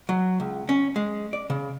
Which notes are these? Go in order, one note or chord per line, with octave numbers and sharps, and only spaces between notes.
F#3
C#2
C#4
G#3
D5
C#3